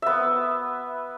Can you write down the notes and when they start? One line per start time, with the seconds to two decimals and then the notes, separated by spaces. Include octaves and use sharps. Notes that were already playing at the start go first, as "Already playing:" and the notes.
0.02 B3 E5